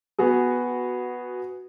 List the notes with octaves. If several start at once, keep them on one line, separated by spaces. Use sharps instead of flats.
B3 F#4 G#4